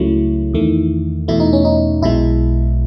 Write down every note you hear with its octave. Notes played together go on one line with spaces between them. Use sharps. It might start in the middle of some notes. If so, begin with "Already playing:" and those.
Already playing: C#2 C#3 F#3 A3 E4
E2 D#3 A3
E2 B2 A3 E4
D#4
C#4
D#4
B1 B2 G#3 E4